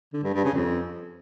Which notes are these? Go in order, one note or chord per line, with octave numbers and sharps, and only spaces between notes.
D3
G2
G2
C#3
F2